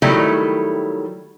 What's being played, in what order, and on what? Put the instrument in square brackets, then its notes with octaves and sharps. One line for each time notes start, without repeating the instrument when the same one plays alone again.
[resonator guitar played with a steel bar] D#3 F#3 G3 A3 E4